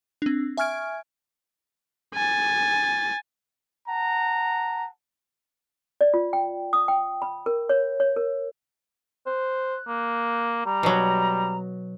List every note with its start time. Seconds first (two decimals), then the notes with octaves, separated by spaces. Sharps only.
0.22 C4 D4
0.57 E5 G#5 C#6 F6 G#6 D7
2.14 G#5 A6
3.89 F#5 A5 A#5
6.01 D5
6.14 F4
6.33 G5
6.73 D#6
6.88 G5
7.22 B5
7.46 A#4
7.69 C#5
8.00 C#5
8.16 A#4
9.26 C5 F#6
9.87 A#3
10.65 G3 A#5
10.83 B2 F#3